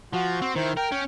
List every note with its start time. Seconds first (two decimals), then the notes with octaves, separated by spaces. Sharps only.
0.13 F3 F#4
0.42 C4
0.56 D#3 E4 C5
0.77 A#4 G5
0.92 C#4